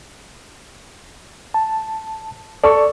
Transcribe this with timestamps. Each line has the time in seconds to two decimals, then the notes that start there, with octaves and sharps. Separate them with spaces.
1.54 A5
2.64 A4 D5 C#6